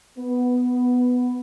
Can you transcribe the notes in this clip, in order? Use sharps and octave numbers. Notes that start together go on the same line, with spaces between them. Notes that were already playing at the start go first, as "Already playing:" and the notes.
B3